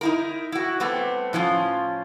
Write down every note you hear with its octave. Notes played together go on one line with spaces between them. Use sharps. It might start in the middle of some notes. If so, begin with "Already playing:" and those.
D#4 E4 A#4
E4 F#4
G3 A3 B3 C4
A2 F3 C#4 F4